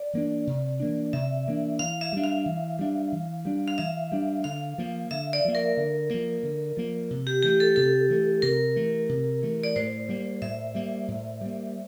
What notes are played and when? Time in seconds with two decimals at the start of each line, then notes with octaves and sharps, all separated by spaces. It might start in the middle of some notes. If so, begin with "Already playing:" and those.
Already playing: D5
0.13 E3 A#3 D4
0.47 C3
0.80 E3 A#3 D4
1.13 C3 E5
1.47 E3 A#3 D4
1.79 E3 F5
2.01 E5
2.13 G3 D4
2.23 F5
2.46 E3
2.79 G3 D4
3.12 E3
3.45 G3 D4
3.68 F5
3.78 E3 E5
4.12 G3 D4
4.44 D3 F5
4.78 F3 A#3
5.11 D3 E5
5.33 D5
5.45 F3 A#3
5.55 A#4
5.77 D3
6.10 F3 A#3
6.43 D3
6.77 F3 A#3
7.11 C3
7.27 G4
7.43 E3 A3 G4
7.60 A4
7.76 C3 A4
8.10 E3 A3
8.42 C3 A#4
8.76 E3 A3
9.09 C3
9.42 E3 A3
9.63 D5
9.76 A2 C5
10.09 G3 A#3
10.42 A2 E5
10.75 G3 A#3
11.08 A2
11.41 G3 A#3